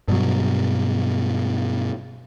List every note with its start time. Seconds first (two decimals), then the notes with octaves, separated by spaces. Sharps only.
0.08 G2 B2 F#3